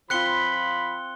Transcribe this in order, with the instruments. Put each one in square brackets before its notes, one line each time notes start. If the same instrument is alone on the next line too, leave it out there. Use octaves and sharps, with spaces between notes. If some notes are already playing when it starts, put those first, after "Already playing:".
[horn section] F3 B5 [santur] C4 F4 [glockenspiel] F#6 C#7 G7